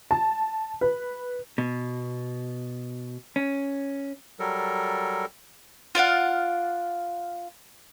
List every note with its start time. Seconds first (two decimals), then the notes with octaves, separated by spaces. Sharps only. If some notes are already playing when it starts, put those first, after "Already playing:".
0.11 A5
0.81 B4
1.58 B2
3.36 C#4
4.39 F#3 G3 A4 A#4
5.95 F4 D5 F5 F#5